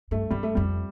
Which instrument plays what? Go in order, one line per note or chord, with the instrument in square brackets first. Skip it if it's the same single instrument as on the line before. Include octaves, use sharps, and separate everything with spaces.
[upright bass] G2 [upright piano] A3
[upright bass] G2 [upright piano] G3
[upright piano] A3
[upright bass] F2 [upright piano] G3